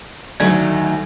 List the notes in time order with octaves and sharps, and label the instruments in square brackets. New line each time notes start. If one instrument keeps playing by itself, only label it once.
[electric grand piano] D2 D5 G#6 [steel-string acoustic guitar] D#3 F#3 A3